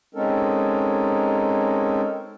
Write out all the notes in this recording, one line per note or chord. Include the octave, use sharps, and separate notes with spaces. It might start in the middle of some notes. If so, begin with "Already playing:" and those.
G#3 C4 C#4 D#4 A4 A#4